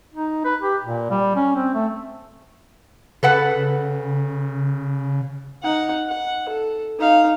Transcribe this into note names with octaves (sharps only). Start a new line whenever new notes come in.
D#4
B4
G4
A#2
G3
C#4
C4
A3
C#3 A4 B4 F#5
D#4 F#5
F#5
A4
D#4 F5